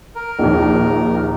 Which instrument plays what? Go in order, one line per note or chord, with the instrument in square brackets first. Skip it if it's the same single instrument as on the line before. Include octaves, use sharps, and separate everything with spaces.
[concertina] A#4
[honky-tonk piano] A#1 D#2